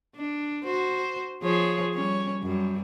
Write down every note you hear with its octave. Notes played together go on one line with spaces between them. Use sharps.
D4
F#4 C5
F3 G#4 C#5
G3 C#4 C#5
F#2 G3